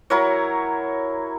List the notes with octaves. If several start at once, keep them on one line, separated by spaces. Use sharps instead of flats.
F#3 E4 A#4 C#5